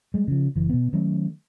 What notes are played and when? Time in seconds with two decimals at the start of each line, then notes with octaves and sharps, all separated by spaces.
0.14 G3 G#3
0.28 C#3 F3
0.56 F#1 E3
0.69 B2 B3
0.93 D#3 F#3 A3 C#4